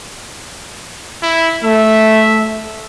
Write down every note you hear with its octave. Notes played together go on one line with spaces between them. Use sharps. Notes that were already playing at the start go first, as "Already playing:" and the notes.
E4
A3 E5